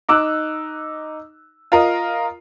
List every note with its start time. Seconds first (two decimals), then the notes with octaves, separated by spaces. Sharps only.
0.09 D#4 D6 E6 F#6
1.72 F4 A#4 D#5